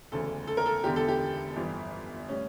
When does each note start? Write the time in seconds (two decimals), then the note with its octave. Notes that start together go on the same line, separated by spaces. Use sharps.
0.11 E1 D2 C#3 E3 A4
0.47 A4
0.57 A#4
0.66 A4
0.84 E1 E2 D3 G4
0.96 A4
1.08 G4
1.56 G1 F2 E3 G3
2.29 A2 G3 C#4